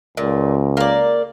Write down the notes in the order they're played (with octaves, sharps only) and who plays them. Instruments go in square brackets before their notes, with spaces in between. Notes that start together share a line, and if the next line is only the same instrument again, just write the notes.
[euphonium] C#2 [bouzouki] A#2
[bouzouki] A#3 D5